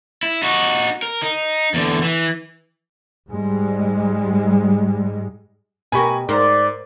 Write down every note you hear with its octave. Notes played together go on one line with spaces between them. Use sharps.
E4
D#4 F#4
A#4
D#4
E2 D3
E3
G#2 G3 G#3
B2 G4 A#4 G#5 B5 C#6
G#2 A#4 C5 D5